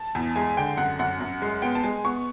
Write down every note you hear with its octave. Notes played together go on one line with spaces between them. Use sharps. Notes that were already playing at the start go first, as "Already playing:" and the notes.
Already playing: A5
E2
G#3 G#5
D3 G5
F#2 F#5
F#2 F#5
F#2
G#3
B3 G5
A5
G#3 G#5
B3 C#6